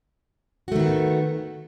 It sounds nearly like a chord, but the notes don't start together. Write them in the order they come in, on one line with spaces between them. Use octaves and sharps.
F#4 A3 D#3 B3